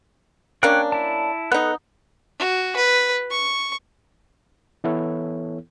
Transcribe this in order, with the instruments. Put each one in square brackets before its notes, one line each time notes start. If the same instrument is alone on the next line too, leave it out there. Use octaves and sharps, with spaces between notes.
[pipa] A#3 C#4 D4 [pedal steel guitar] C#5 G5 F#6
[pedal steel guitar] E4 A5
[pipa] B3 D#4 [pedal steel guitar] A4 F#6
[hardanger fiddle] F#4
B4
C#6
[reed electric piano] E3 B3 E4 A4 C#5